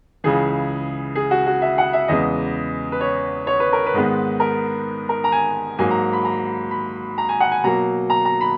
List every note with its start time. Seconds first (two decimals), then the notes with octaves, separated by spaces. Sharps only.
0.24 C#2 C#3 E3 G#4
1.15 G#4
1.31 F#4
1.47 F#4
1.62 E5
1.78 F#5
1.93 E5
2.08 E2 C#3 G#3 B3 D#5
2.92 B4
3.01 C#5
3.47 C#5
3.60 B4
3.73 A#4
3.86 B4
3.94 G#2 D#3 G#3 B3
4.40 A#4
5.09 A#4
5.24 A#5
5.32 G#5
5.78 G#2 F#3 A#3 G#5
5.91 A#5
6.13 B5
6.25 A#5
6.71 B5
7.18 A#5
7.29 G#5
7.40 F#5
7.52 G#5
7.64 B2 F#3 A#3 A#5
8.10 A#5
8.25 A#5
8.41 B5